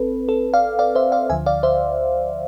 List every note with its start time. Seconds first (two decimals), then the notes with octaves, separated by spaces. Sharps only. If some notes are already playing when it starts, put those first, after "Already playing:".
Already playing: A1 C4 A4 B4
0.29 A4
0.54 D5 F5
0.79 D5 F5
0.95 C5 E5
1.12 D5 F5
1.30 D2 D3 F3 E5 G#5
1.46 D5 F5
1.63 C5 E5